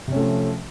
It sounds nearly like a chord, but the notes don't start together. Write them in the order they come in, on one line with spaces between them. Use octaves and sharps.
C3 C#4 A3 F3